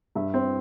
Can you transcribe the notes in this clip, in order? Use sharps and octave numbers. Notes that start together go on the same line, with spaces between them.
G2 E5
C4